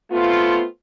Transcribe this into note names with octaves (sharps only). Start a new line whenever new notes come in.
A3 B3 C4 F4